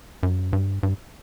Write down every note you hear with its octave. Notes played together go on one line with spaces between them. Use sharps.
F#2
G2
G2